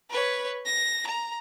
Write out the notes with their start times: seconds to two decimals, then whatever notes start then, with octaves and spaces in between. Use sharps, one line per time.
0.10 B4 C#5
0.66 A#6
1.07 A#5